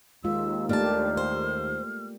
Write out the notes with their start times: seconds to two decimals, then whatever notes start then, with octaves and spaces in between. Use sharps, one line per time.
0.24 D#2 G#3 F4 E6
0.69 A3 A#3 D4 G4 A5 F6
1.17 C5